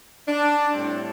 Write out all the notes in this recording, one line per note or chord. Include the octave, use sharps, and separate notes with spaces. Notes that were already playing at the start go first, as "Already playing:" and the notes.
D4
A2 G3 C4